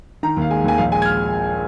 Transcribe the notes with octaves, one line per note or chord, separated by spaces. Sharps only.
D#3 A#5
D#2 F5
G#3 G#5
D#2 G#5
A#1 F5
G#3 G#5
G#6
F6